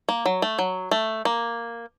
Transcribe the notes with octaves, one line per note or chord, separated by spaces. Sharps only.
A#3
F#3
A3
F#3
A3
A#3